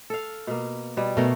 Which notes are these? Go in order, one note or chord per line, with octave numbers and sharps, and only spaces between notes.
A4 F5
B2 A#3
B2 G3
B2 A3 B3 A#4